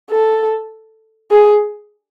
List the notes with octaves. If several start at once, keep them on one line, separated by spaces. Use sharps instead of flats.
A4
G#4